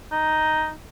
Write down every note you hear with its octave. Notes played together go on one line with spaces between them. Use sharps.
D#4